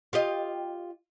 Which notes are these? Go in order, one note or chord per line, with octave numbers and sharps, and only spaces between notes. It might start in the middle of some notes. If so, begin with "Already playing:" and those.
F4 G4 D#5